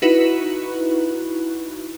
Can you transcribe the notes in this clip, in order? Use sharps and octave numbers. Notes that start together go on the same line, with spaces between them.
D#4 E4 F#4 B4